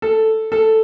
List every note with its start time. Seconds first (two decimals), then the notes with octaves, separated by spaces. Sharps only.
0.02 A4
0.52 A4